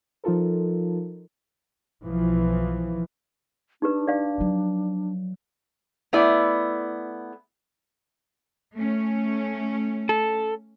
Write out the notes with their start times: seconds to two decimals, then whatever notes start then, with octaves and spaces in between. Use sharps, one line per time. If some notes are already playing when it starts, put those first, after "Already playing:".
0.24 F3 D#4 F4 A4 A#4
2.04 B1 E3 F3
3.82 D4 D#4 G4 B4
4.08 D5 F5
4.38 F3 F#3
6.13 A3 B3 E4 D5
8.76 A3 C#4
10.09 A4